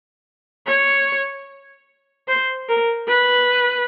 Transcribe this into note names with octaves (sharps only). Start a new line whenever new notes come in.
C#5
C5
A#4
B4